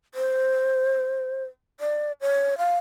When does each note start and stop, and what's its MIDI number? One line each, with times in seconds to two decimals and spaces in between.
0.15 1.44 72
1.80 2.12 74
2.21 2.58 73
2.58 2.78 77